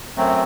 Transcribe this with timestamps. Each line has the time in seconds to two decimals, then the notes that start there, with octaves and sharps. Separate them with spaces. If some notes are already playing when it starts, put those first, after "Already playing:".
0.17 F#2 F#3 A3 C4